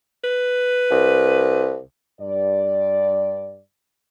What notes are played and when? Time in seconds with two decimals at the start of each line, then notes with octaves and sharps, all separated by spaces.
0.24 B4
0.91 C2
2.21 G2 D5